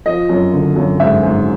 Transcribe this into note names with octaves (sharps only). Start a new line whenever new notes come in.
F3 D#5
F#2
D3
F#2
G#2 E5
G#2